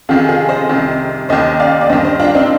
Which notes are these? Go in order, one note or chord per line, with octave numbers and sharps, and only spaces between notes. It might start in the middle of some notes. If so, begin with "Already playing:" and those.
F2 C3 D#3 F4 G#4
F4 G#4
C5 D#5
C2 C3 D#3
D#2 D#3 C5 D#5
D5 F5
D5
G2 D#3 C5 D#5
C5 D#5
D4 F4
C4 D#4